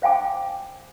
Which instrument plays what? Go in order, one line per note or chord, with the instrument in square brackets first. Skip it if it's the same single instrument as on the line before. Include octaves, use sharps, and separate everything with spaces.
[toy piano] C5 F5 G5 G#5 D6